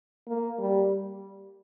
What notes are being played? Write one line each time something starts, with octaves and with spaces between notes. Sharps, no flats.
A#3
G3